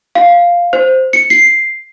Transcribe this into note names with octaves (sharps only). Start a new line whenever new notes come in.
F5
C5
C#7
C7